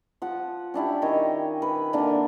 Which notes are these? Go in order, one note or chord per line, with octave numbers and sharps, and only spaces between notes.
F3 F#5
C#4 D4 E4 G4
D#3 C#5 D#5
B4
D3 E3 A#3 D4